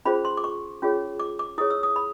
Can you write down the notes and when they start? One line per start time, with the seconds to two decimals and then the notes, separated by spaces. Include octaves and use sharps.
0.05 C#4 F4 G#4 C5 B5
0.25 C6
0.37 D6
0.44 C#6
0.82 C#4 F4 G#4 C#5
1.20 D6
1.39 D6
1.58 E4 G#4 C#5 D#6
1.70 E6
1.83 D#6
1.96 B5